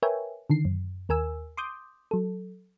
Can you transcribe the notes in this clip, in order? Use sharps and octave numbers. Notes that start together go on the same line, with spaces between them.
A#4 B4 C#5 E5 G5 G#5
D3 D#3 C7
F#2
D#2 A#4 G#5 E6
C6 D6 D#6 G6
F#3 A4